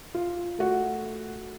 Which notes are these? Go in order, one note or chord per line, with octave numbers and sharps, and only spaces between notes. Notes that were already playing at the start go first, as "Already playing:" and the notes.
F4
A3 F#4